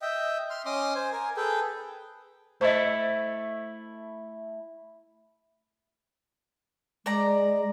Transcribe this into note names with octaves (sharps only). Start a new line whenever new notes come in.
D#5 E5 G5
C6 F6
C#4 D#5 C6 D6 D#6
C5 G#5
A#4 G#5
G#4 A4 B4 G5
A3 E4 C5 D#5
G#3 D5 A#5